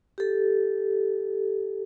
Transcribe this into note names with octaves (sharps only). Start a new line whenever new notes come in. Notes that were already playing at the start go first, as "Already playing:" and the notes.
G4 A4